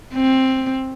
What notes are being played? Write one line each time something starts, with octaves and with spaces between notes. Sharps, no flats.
C4